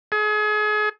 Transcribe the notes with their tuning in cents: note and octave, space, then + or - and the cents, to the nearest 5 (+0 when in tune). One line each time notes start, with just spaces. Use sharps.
G#4 +35